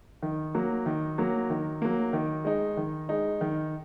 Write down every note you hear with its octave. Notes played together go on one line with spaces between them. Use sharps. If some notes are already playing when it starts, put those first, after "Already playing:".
D#3
F#3 A#3
D#3
F#3 A#3
D#3
F#3 A#3
D#3
G#3 D#4
D#3
G#3 D#4
D#3